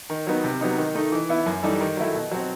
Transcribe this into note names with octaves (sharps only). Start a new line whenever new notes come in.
D#3
F#3 B3 D#4
C3
F#3 B3 D#4
D#3
A3 D#4
E3
B3 E4
F#2
E3 G3 D#4 A4
D#3
F#3 A3 E4
B2
F#3 C4